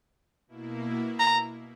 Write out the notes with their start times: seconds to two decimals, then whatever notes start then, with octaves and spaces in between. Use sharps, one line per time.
0.48 B2 A#3 E4
1.20 A#5